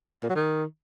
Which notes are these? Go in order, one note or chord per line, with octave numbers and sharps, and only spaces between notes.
A#2
F#3
D#3